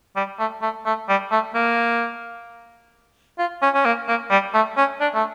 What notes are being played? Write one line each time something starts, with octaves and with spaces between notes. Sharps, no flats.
G3
A3
A3
A3
G3
A3
A#3
F4
C#4
C#4
A#3
A#3
G3
A3
C#4
D4
A3